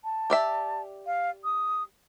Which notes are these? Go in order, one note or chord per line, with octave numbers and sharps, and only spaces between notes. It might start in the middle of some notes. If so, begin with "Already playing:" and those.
A5
G4 D5 E5
F5
D#6